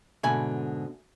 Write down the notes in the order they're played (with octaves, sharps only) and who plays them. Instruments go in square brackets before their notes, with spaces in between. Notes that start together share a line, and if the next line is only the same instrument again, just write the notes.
[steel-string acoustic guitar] G#2 B2 D3 [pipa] A3 G#5 B5